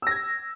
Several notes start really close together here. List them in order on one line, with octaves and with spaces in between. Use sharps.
E6 A#6 G#6